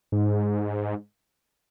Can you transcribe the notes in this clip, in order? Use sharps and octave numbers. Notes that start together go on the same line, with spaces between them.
G#2